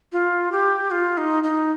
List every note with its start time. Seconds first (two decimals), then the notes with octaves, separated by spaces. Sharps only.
0.12 F4
0.52 G4
0.91 F4
1.17 D#4
1.44 D#4